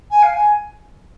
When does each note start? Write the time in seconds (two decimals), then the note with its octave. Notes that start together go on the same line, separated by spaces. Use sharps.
0.11 G#5
0.23 F5
0.34 G#5